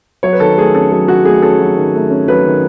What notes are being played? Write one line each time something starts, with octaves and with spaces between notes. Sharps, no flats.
F#3 C#5
B4
D#3 A4
A3 G#4
C#4 A4
F#3 G#4
D#3 F#4
A3 G#4
C#4 A4
F#3
D#3
A3
C#4
F#3 B4
D#3